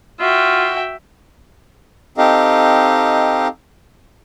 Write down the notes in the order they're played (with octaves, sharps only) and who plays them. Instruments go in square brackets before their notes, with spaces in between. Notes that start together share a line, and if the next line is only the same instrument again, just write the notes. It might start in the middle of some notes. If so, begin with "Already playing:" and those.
[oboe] F4 [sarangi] F#4 [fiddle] E5 G5
[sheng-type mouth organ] C4 D#4 G4 A4 D#5 F5